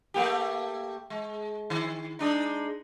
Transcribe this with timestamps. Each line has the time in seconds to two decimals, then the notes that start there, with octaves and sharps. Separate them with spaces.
0.14 A3 A#3 G4
1.10 G#3
1.70 D#3
2.19 G#3 D4 D#4